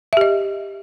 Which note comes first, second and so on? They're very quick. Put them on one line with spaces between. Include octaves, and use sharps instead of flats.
E5 G4 D#5